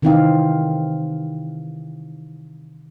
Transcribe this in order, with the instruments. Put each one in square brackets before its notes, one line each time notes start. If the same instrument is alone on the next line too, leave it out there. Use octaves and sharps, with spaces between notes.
[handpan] C3 D#3 E3 C4 D#4 F5